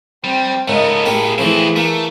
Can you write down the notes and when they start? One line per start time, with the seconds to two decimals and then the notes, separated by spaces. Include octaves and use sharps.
0.24 G3 C4 G5
0.68 G#2 C#3 A3 B3 A#4 D#5
1.06 A1 A#3 G4 G#4
1.38 E3 F3 A3 C4 E4
1.76 A3 A#3